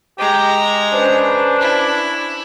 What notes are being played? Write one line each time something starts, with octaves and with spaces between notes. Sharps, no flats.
G#3 G4 A#5
C#4 D4 B4 C5
E4